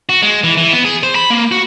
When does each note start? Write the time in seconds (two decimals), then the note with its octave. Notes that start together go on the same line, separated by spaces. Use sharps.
0.09 F#4
0.22 G#3
0.44 E3
0.57 E3
0.73 B3
0.85 G#4
1.03 C5
1.15 B5
1.30 A#3
1.52 F#4